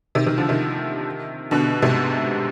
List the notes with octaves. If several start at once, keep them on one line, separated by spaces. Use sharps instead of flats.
C3 D#3
C3 D#3
D3 F3
C3 D#3
B2 D3
G#2 C3